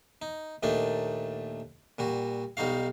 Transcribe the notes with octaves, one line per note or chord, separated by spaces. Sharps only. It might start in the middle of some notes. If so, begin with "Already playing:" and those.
D#4
D#2 A#2 A3 D4 D#4
A#2 G3 F#4
B1 G3 D#4 F#4 F5